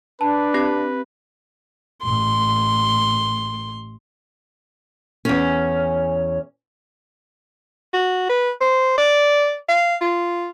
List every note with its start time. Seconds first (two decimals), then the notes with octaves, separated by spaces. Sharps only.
0.21 D4 B4 A5
0.54 C4 G4 A#6
2.04 A1 C6
5.25 E2 C#4
7.93 F#4
8.29 B4
8.61 C5
8.98 D5
9.68 F5
10.01 F4